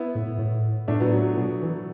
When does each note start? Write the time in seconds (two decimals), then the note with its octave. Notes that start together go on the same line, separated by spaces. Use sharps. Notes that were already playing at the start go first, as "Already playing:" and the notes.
Already playing: B3 E4
0.15 A2
0.38 A2
0.88 A2 A3 D4
1.00 F#3 B3
1.12 F#3
1.37 B2 F#3
1.62 E3